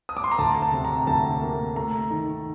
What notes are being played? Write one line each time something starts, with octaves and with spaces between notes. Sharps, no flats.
D#6
D6
C6
A#5
D2 A5
A5
C3
A#5
D2 A5
A#3
A3 A#5
D#3